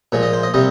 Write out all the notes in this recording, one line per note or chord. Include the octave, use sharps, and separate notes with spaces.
A#2 F3 G#3
D#5
C5
D#5
C3 G3 D#5